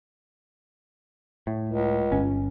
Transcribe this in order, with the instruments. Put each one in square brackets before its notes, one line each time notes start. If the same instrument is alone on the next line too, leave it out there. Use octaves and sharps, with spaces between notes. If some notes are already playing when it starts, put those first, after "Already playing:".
[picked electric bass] A2
[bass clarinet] C#2
[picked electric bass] G1 C#4